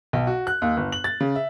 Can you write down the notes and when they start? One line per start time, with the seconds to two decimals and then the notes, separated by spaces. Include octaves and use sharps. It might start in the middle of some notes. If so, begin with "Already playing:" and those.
0.13 B1
0.27 F#4
0.47 F#6
0.62 D#2
0.77 G1
0.92 F#7
1.04 A6
1.20 C#3
1.35 E5